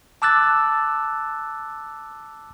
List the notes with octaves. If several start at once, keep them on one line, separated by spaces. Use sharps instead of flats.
A5 D6 E6 F#6 A6